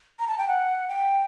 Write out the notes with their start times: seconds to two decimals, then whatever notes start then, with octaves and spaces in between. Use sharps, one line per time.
0.19 A#5
0.28 A5
0.38 G5
0.48 F#5
0.88 G5